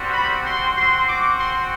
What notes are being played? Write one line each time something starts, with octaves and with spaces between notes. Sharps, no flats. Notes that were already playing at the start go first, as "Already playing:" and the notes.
Already playing: G3 C4 F#4
B5
C6
C4 F#4 C6
D6
C6